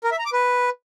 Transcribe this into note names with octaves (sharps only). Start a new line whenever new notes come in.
A#4
E5
A#5
D6
B4